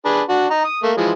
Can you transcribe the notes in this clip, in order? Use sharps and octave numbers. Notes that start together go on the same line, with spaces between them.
D4 G#4 B4
D4 F#4
D#4 A#5
D#6
A3 A#3
E3 F3 G#3